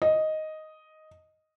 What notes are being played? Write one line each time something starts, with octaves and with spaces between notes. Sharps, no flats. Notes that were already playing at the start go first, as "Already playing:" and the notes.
D#5